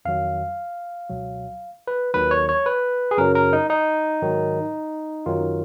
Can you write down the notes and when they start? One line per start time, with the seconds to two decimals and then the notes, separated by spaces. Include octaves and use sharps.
0.05 F2 D#3 F#3 F5
1.10 C#2 B2 F#3
1.87 B4
2.14 D#2 D#3 F#3 B4
2.31 C#5
2.49 C#5
2.66 B4
3.11 G#4
3.18 F#2 C#3 F#3 A#4
3.35 A#4
3.53 D#4
3.70 D#4
4.22 G#2 D#3 F#3
5.26 F#2 D#3 F#3 F4